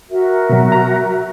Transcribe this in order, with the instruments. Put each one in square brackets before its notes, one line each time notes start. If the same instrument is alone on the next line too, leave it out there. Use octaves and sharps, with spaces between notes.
[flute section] F#4 A#4 E5
[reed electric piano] B2 F#3
A#5